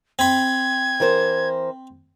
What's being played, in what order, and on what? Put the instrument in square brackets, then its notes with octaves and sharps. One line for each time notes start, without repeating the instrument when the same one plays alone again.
[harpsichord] C4 B5 [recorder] G#6
[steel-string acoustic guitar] E3 A#4 C5